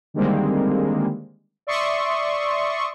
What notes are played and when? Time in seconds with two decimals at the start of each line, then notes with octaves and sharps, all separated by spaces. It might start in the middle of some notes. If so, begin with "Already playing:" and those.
0.14 D3 D#3 G3 G#3 A#3 C4
1.67 D5 E5 C6 C#6 D#6